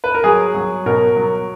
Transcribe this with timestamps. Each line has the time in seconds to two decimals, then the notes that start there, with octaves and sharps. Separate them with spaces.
0.04 B4
0.15 A#4
0.24 F#3 G#4
0.55 F#3
0.86 B2 A#4
1.16 F#3